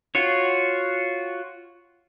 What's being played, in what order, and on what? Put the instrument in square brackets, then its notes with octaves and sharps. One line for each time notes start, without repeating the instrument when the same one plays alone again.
[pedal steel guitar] F4 F#4 C#5